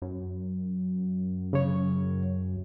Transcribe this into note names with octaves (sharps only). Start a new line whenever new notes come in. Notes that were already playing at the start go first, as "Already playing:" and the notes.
F#2
C#3 C#5